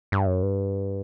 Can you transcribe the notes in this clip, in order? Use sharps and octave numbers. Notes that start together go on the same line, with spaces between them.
G2
F#2
G2